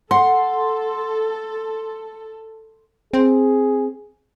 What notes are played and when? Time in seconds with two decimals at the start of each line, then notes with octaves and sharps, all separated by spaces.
0.11 A4 F#5 C6
3.13 C4 G#4